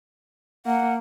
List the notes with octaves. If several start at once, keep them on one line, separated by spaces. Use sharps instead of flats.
A#3 F#5